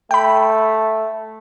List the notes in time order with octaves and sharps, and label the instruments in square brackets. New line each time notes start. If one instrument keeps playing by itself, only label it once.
[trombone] A3 [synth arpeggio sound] G5 B5